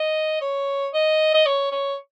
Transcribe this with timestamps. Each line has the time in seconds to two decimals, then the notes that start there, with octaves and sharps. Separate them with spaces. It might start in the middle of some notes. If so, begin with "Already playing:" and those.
Already playing: D#5
0.41 C#5
0.94 D#5
1.34 D#5
1.46 C#5
1.72 C#5